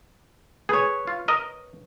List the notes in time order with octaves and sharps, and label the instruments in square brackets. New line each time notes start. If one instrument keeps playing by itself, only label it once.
[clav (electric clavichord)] G#4 [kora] B4 C#5
[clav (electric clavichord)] F4
A#4 D#5